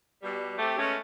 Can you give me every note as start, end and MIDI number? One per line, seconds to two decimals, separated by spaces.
0.22 0.54 47
0.22 0.54 55
0.58 0.74 57
0.58 0.74 60
0.58 0.74 67
0.78 0.95 56
0.78 1.00 57
0.78 0.95 59
0.78 0.95 61